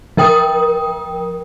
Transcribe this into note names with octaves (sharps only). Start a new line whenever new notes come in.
F3 A#4 G5 D#6